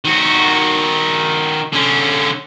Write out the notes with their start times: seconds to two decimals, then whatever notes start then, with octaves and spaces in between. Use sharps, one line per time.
0.05 D#3 F#4
1.73 D3 C#4